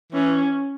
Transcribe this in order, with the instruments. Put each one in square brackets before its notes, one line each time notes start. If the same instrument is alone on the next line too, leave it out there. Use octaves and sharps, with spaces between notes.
[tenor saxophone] E3 [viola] C#4